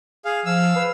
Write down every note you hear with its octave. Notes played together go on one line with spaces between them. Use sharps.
G#4 F5
F3 F5 E6
B4